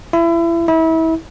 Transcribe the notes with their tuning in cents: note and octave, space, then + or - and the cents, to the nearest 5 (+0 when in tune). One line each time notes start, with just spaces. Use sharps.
E4 +30
E4 -30